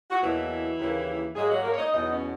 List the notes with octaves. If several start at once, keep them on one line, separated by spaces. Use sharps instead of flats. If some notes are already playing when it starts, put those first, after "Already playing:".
F#4
E2 B2 E3 F#3 A#3 E4
D#2 C#3 E3 A#3
G#2 F#3 G#3 A#3 G#4
F#3 F#4
A#3 A#4
C#5
D#4 D#5
E2 B2 F#3 B3 D#4 D#5
C#4 C#5